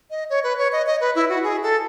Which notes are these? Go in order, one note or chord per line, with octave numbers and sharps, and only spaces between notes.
D#5
C#5
B4
C#5
D#5
D#5
B4
E4
F#4
G#4
A4